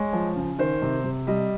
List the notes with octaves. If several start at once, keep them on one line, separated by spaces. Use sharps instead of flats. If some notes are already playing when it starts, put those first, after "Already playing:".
Already playing: G#3 C#5
F3
C#3
D#3 C5
C3
C3
G3 D#5